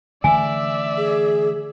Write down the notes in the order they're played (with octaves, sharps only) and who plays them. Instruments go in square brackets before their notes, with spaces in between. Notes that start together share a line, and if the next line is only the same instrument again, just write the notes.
[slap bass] D3 E3 A3 [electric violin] D5 E5 [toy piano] G#5
[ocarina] G#4